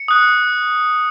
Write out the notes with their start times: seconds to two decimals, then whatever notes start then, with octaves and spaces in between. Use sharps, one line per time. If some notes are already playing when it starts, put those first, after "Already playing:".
Already playing: C#7
0.08 D#6 F#6